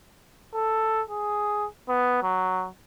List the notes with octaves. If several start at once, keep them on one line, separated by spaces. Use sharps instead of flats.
A4
G#4
B3
F#3